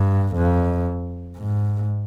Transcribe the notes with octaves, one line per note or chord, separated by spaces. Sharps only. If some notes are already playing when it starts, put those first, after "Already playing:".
Already playing: G2
F2
G#2